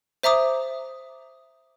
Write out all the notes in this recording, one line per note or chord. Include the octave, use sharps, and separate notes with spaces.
C5 E5 A#5 D6 D#6